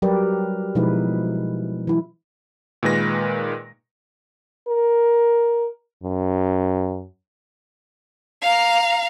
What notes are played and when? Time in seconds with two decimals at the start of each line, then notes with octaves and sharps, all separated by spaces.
0.02 F#3 G3 G4 A#4 B4 D5
0.75 B2 F3 G#3 D#4 E4 B4
1.87 E3 F#3 E4
2.83 A#2 D#3 G#3 B4 A#6
4.68 A#4
6.03 F#2
8.42 F5 A#5